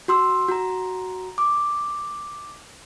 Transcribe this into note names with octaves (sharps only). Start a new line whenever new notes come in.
F#4 C6 E6
F#4 A#5
D6